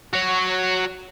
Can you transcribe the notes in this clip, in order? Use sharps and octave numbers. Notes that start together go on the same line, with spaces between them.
F#4 C#5